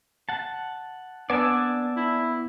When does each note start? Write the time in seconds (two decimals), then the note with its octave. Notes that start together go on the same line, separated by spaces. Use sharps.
0.29 F#5 A5
1.30 B3 D4 D5 G#5 A5 E6
1.96 E4